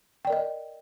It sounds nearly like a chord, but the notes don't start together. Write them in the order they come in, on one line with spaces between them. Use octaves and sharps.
G5 D5 A#4 D#5